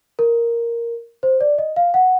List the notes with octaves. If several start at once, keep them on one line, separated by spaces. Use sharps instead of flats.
A#4
C5
D5
D#5
F5
F#5